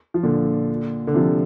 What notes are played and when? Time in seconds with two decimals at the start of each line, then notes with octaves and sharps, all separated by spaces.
0.14 F3
0.23 A#2 D3
1.07 D3
1.14 C3 F3